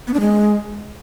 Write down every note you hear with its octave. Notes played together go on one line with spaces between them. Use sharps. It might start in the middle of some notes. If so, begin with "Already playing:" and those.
B3
D4
G#3